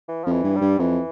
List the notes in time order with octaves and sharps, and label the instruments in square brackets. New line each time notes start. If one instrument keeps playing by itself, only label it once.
[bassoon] E3
[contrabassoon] F2 [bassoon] F3
[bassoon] E3
[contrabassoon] G2
[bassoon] G3
[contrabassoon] G2
[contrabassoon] F2 [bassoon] E3